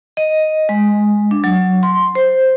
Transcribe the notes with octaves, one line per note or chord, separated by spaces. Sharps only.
D#5
G#3
D4
F#3
C6
C5